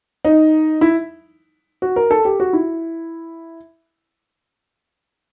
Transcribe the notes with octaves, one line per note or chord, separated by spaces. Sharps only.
D#4
E4
F#4
A#4
A4
G4
F#4
E4